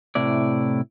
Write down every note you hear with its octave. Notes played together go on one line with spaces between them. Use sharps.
A2 C3 E4 D5